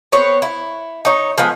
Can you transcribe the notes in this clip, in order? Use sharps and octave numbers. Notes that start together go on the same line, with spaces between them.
B3 C4 C#5
E4
D#4 C#5
F3 G#3 B3